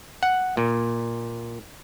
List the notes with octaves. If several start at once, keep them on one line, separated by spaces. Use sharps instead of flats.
F#5
A#2